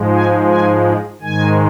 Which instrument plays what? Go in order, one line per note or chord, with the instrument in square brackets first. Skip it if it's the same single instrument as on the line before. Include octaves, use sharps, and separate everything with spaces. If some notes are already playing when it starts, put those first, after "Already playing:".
Already playing: [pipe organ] G#2 F3 G#3
G#5
G#5
G#2 D#3 G#3 G#5